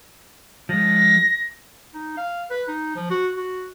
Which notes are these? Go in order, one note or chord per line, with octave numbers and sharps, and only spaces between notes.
F3 G#3 A#6
D#4
F5
B4
D#4
F3
F#4
F#4